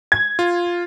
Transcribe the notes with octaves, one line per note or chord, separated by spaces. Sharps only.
G#6
F4